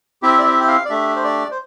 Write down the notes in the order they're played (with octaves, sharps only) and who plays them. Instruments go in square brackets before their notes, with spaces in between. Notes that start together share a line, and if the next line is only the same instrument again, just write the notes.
[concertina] C4 E4 G4 E5
D5
E5
G5
F5
D5
A3 D4 G4 E5
C5
D5
C5